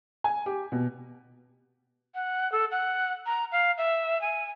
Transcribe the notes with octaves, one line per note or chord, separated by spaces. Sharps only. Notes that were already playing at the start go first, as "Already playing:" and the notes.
G#5
G4
B2
F#5
A4
F#5
A#5
F5
E5
G#5